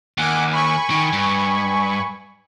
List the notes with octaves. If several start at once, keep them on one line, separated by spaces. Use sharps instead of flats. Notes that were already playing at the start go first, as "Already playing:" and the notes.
D#2 F#5 G#5 D6
G#5 B5 C#6
D#3
G2